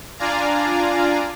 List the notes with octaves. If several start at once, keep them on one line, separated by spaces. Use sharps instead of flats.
D4 F4 D5 F5 G#5 A#5